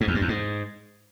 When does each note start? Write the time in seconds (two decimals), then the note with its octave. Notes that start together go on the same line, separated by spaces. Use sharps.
0.01 G#2
0.08 E2
0.15 G2
0.22 E2
0.28 G#2